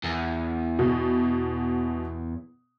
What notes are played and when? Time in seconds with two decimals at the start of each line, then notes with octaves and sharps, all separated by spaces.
0.04 E2
0.79 B2